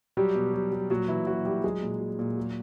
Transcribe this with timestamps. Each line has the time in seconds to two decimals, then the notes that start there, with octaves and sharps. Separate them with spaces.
0.17 F#3 G3 G4
0.35 B2
0.54 F#3
0.72 F#3
0.90 A#2 F#3 F#4
1.08 A#2 E3 E4
1.27 F#3 F#4
1.45 F#3 G3 G4
1.64 F#3 G#3 G#4
1.82 A#2
2.00 F#3
2.19 A#2
2.37 F#3